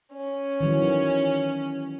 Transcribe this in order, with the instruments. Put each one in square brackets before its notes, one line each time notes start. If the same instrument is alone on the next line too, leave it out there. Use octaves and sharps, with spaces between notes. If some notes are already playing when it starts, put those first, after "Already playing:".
[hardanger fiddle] C#4
[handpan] D#3 E3 F#3